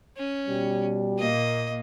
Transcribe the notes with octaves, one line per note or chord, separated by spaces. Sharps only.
C#4
B2 G3
A#2 A#3 D#5